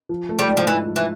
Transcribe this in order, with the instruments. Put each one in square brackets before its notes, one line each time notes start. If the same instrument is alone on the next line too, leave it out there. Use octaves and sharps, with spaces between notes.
[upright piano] F3
A3
[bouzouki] G3
[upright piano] G#2
[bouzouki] F3
[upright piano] G#2 [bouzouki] E3
[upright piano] F3
[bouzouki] E3